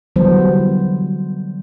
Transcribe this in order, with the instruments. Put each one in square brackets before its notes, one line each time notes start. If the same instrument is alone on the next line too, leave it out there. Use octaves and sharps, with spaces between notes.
[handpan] D3 E3 F#3 G3 B3 C5